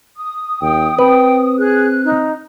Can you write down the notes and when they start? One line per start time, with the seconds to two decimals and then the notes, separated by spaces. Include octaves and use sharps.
0.16 D#6
0.61 D#2 G5
0.99 C4 B4 G5
1.58 G#4 F#6
2.04 D#4